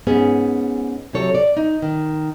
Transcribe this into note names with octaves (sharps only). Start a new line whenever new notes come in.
G#2 B3 C#4 G#4
C3 F#3 A4 C#5
D5
D#4
D#3